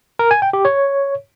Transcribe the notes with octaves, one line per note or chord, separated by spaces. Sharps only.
A#4
G#5
G5
G4
C#5